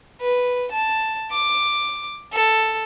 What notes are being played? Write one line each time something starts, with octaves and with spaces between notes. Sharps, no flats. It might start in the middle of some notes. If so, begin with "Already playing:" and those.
B4
A5
D6
A4